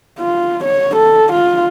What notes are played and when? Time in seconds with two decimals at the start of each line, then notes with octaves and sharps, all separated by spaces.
0.19 F4
0.65 C#5
0.96 A4
1.33 F4